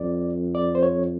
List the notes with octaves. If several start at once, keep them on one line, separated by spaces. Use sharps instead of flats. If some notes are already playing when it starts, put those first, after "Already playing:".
Already playing: F2 D5
D5
C5
C#5